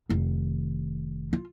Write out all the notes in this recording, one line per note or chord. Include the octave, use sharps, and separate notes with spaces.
F1 D#3
F4